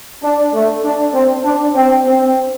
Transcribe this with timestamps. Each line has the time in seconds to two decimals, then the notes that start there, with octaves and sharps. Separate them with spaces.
0.23 D4
0.53 A3
0.83 D4
1.13 C4
1.44 D4
1.75 C4
2.05 C4